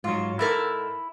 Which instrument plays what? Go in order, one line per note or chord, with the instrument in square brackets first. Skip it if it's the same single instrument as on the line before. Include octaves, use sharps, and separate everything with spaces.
[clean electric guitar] G#2 F#3 [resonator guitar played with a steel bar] F4
[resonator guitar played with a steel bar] G#2 A4 A#4 [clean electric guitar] E4